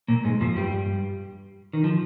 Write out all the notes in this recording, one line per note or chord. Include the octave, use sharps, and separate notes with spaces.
A#2 A#3
G#2 G#3
F2 F3
G2 G3
D#3
F3